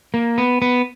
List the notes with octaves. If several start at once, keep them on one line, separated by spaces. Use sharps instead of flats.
A#3
B3
B3